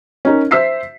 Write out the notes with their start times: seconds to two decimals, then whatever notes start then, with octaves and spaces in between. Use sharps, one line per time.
0.25 C#4 D#4 A#4
0.51 C5 E5 E6 B6 C7